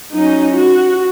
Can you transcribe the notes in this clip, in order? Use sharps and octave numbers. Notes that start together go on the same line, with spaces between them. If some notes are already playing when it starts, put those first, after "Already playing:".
F#3 C#4 D#4
F#4